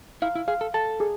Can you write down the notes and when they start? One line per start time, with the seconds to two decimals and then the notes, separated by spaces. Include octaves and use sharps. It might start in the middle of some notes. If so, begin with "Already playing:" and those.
0.22 E4 F5
0.35 E4
0.48 G#4 F5
0.61 A4
0.74 A4 A5
1.00 G#4